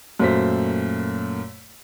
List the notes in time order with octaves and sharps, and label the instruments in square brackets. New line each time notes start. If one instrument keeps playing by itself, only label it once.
[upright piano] F#2 A#2 A3 C5 B6